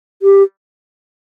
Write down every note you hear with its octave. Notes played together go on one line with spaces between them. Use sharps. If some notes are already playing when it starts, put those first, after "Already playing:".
G4